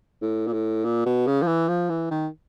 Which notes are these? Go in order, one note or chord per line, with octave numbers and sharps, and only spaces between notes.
A2
A#2
A2
A#2
B2
C#3
F3
E3
F3
E3
D#3